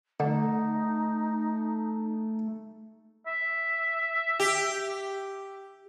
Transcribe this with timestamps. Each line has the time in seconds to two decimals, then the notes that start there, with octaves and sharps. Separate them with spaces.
0.20 D3 A3 D#4
3.27 E5
4.40 G4